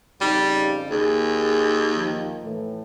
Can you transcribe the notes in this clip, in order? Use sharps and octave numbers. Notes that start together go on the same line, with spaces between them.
F2 C#3 G3 D#4
D#2 G#4
D#3 F3
A2 E3 A3